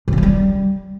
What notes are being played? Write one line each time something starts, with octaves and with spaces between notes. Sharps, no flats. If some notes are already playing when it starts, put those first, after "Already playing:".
F#2
C#3
F#3
G3